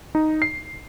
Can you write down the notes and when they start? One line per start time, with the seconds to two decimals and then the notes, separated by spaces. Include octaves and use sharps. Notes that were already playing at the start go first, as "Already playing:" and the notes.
0.15 D#4
0.42 C7